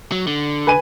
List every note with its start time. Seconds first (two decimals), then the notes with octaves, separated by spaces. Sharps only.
0.12 F#3
0.27 D3
0.67 B4 G#5 D#7